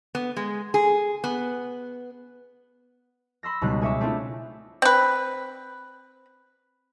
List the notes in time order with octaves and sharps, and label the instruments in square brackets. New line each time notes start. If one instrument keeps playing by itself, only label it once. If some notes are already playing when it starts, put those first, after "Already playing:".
[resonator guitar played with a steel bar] B3
G#3
G#4
B3
[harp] B5 C6 E6 A#6
C#2 B2 G3 D#4 F#6
G#4 C#5 E5 D6
A3 C4 D4 E4 F4
[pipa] C4 B4